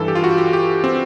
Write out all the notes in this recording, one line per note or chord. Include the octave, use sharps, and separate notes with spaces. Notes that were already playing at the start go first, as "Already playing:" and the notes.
Already playing: G2 E3 A4
G4
F4
F#4
G4
G4
C4